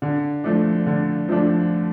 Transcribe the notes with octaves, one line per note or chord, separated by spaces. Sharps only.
D3
F3 A3 D4
D3
F3 A3 D4